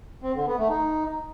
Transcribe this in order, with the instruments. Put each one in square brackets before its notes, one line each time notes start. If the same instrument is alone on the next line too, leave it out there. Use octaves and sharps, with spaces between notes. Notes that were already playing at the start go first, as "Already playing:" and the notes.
[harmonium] C4
D3
B3
A3
D#4